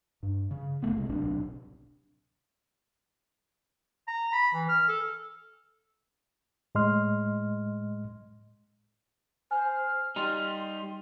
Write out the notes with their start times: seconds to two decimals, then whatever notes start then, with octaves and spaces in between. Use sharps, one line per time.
0.23 G2
0.51 C#3
0.82 F#1 F2 A3 B3
0.97 C2 C3 G#3
1.09 D1 B1 C3 D4
4.08 A#5
4.33 B5
4.54 E3
4.69 F6
4.88 A4
6.75 A2 G#3 D#5 C6 F6
9.51 C5 G#5 F6
10.16 G3 D#4 G4 C6